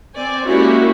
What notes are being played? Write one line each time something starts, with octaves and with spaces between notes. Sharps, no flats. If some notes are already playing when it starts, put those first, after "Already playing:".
C4 D5 G#5
G#3 A#3 C#4 E4 F#4 G4